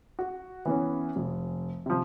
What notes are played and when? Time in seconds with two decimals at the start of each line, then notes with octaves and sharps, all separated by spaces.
0.19 F#4
0.65 E3 B3 C#4
1.16 F1
1.86 C3 F3